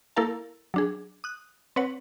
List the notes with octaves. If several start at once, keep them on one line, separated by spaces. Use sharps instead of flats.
A#3 E4 A4 A#4 F5 A5
F#3 D4 G#4
D#6 F#6
C4 B4 C#5 F#5